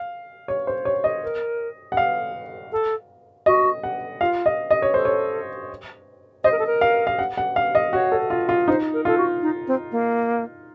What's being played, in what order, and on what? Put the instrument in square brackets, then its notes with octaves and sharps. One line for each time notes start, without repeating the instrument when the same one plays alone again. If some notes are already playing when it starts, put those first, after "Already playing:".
Already playing: [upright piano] F5
C#5
C5
C#5
D#5
[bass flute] A#4
[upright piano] F#5
F5
[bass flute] A4
[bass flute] F#4 [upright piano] D#5
[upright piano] F#5
[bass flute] F4 [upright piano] F5
[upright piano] D#5
D#5
C#5
[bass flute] A4 [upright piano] C5
[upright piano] C#5
[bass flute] C5 [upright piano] D#5
[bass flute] A#4
A4
A#4
[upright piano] F5
F5
F#5
F#5
F5
D#5
[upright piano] F#4 [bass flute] C#5
[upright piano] A4
F4
F4
[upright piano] D#4 [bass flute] C5
[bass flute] A#4
[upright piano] F4 [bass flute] A4
[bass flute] F#4
D#4
C4
A#3